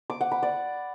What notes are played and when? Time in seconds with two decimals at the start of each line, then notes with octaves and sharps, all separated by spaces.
0.10 D6
0.21 F#5
0.32 B5
0.43 D5